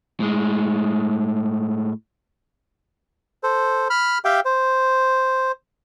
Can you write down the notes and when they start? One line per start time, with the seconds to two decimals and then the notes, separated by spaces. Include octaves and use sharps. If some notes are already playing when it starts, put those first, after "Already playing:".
0.20 A2 G#3
3.43 A4 C5
3.90 B5 F6
4.25 G4 E5 F5 G5
4.45 C5